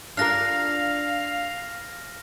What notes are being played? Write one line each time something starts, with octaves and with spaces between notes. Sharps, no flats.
D4 F4 A#4 F5 F6 A#6